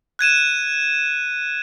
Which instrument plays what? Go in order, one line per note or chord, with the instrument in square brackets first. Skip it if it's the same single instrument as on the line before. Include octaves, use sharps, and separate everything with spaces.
[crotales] F#6 G#6 D#7 E7